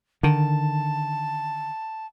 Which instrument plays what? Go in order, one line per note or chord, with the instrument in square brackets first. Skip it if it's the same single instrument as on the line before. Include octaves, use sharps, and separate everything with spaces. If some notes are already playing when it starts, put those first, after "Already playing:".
[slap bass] D3 D#3 [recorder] A5